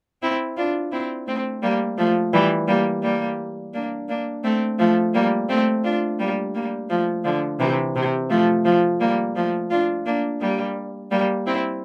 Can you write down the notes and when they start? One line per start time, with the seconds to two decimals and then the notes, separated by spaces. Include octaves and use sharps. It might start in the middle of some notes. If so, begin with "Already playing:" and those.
0.22 C4 E4
0.57 D4 F4
0.92 C4 E4
1.27 A3 C4
1.63 G3 A#3
1.98 F3 A3
2.33 E3 G3
2.68 G3 A#3
3.03 G3 A#3
3.74 A#3 D4
4.09 A#3 D4
4.44 A3 C4
4.79 F3 A3
5.14 G3 A#3
5.49 A3 C4
5.84 D4 F4
6.19 G3 A#3
6.55 G3 A#3
6.90 F3 A3
7.24 D3 F3
7.60 C3 E3
7.96 C3
8.30 F3 A3
8.65 F3 A3
9.00 G3 A#3
9.36 F3 A3
9.70 D4 F4
10.06 A#3 D4
10.41 G3 A#3
11.11 G3 A#3
11.46 C4 E4